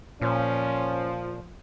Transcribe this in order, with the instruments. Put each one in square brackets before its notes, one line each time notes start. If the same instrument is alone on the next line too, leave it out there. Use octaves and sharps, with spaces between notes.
[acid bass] A#2 [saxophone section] F3 [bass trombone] C#4